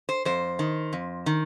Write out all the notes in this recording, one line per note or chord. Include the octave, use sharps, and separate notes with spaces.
C5
F2 C5
D#3
F2
D#3